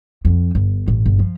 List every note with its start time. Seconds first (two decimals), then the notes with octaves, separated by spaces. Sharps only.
0.25 F2
0.55 G1
0.88 A1
1.05 G1
1.19 F3